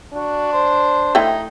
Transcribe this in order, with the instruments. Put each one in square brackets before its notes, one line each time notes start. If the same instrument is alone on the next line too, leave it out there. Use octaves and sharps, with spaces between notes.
[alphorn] D4 [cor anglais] F#4
[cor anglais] C5
[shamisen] A3 E4 G5 [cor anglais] D#4